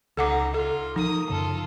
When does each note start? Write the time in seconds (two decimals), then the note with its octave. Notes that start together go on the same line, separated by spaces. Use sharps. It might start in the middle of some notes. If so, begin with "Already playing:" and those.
0.17 C#2 D#4 A4 F#5 D6
0.54 F4 A4
0.96 F3 A#3 D#4 D#6
1.30 F#2 C#3 F4 A4